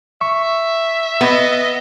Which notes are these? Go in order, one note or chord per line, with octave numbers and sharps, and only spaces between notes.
E5 C#6
B3 D#5